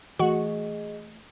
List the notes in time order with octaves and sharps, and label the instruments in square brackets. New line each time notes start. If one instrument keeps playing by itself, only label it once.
[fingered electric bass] E3 A3 [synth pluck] F#4 F#5 [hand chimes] G#4 D#5